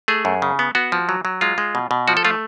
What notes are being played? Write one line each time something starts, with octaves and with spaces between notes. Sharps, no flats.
A3 G#4
F#2
C#3
B3
B3 F#4
F3
F#3
F#3
G#3 F4
G#3
B2
B2
F3 F#4
A4
A3 F4